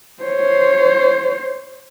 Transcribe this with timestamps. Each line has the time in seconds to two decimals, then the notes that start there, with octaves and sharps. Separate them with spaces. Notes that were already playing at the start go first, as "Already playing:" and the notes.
0.23 C5 C#5